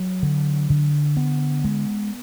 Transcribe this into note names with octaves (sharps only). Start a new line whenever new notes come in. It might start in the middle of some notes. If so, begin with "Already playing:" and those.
Already playing: F#3
D3
D3
B3
G#3